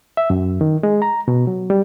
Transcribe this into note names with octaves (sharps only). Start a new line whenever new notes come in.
E5
F#2
D#3
G#3
A#5
B2
F#3
G3